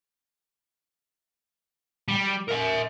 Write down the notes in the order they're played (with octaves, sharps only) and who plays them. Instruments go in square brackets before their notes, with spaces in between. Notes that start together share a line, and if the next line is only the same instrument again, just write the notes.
[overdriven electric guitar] G3
A#4 E5